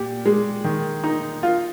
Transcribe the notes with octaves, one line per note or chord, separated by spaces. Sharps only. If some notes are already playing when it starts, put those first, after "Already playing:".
Already playing: A#2 G4
G#3
D#3
D#4
F4